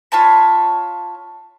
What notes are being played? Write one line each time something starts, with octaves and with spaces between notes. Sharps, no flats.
F4 C#5 A5 B5